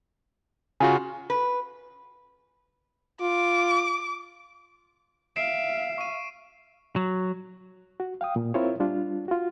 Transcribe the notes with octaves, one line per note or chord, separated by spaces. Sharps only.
C#3 F4 F#4 G#5
B4
F4 D6
E5 F5 C7 D7 E7
C#6 D#7
F#3
F#4
F5 G5 D#6
A#2
C4 E4 F4 A#4 C5 C#5
G3 D4 F4
F4 F#4